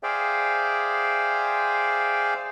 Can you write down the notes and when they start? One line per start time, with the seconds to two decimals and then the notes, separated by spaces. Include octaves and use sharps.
0.03 G#4 C5 D5 E5 F5 G5